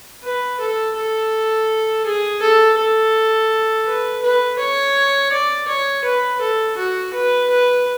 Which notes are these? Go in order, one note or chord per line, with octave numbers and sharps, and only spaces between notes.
B4
A4
A4
G#4
A4
A4
B4
B4
C#5
D5
C#5
B4
A4
F#4
B4
B4